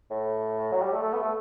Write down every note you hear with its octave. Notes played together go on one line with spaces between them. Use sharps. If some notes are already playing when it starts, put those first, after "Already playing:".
A2
F#3
G3
A3
A3
B3
A3